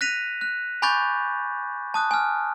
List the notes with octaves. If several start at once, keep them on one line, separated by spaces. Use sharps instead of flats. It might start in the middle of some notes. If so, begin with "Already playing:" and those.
F#6 A#6 B6 D#7 F7
F#6
G#5 B5 C#6 D6 G6 A6
A5 D#6 F#6
G#5 F6